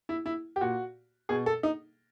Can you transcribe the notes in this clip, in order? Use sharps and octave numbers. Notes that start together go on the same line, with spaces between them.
E4
E4
G4
A#2 F#4
B2 G#4
A4
D#4